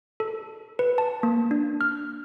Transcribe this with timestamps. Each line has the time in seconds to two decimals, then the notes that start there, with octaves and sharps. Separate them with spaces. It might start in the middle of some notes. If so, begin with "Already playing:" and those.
0.20 A4
0.79 B4
0.98 A5
1.23 A#3
1.51 D4
1.81 F6